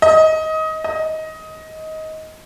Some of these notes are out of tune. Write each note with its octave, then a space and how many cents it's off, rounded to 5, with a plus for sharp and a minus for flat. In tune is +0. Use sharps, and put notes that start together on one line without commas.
D#5 +20
D#5 +15